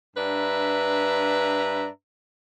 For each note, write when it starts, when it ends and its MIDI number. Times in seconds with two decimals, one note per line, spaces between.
0.16 1.88 43
0.16 1.88 62
0.16 1.88 71
0.16 1.88 76
0.16 1.88 82